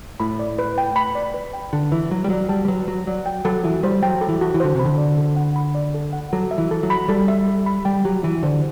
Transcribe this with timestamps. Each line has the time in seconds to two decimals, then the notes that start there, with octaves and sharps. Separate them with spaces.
0.20 A2 B5
0.39 D5
0.59 B4
0.78 G5
0.96 B5
1.15 D5
1.34 B4
1.53 G5
1.73 D3 A5
1.92 E3 B4
2.11 F#3 F#4
2.24 G3
2.30 F#3 D5
2.49 G3 A5
2.65 G3
2.68 F#3 B4
2.88 F#3 F#4
3.07 F#3 D5
3.26 G5
3.45 F#3 A4
3.64 E3 F#4
3.83 G3 C5
4.03 F#3 G5
4.21 A4
4.29 E3
4.41 F#4
4.54 E3
4.60 D3 C5
4.75 C3 B5
4.85 D3
4.98 D5
5.18 A4
5.36 F#5
5.56 B5
5.75 D5
5.94 A4
6.13 F#5
6.33 F#3 A4
6.51 E5
6.58 E3
6.71 A4
6.83 F#3
6.90 B5
7.08 G3 A4
7.28 E5
7.48 A4
7.66 B5
7.85 G3 G5
8.05 F#3 G4
8.23 E3 E4
8.43 D3 C5